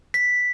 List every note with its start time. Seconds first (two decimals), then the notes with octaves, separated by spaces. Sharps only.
0.14 B6